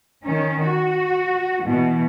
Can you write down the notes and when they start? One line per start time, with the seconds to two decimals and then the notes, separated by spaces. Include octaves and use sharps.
0.24 D#3 C#4
0.65 F#4
1.62 B2 E3